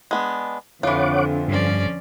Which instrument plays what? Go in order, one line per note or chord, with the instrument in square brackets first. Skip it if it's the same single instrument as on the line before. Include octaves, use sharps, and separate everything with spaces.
[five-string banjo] G#3 B3 D4
[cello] F2 D3 [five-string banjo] E3 F4 [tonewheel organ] C#5 F#5 D6
[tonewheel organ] G2 [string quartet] F3 C#4 D5